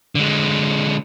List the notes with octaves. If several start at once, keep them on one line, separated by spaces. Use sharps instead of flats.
D3 G#3